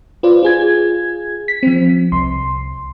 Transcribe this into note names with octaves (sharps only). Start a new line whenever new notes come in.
F4 B4 C5 D5
F4 G#4 G#6
B6
F3 C4
C2 C6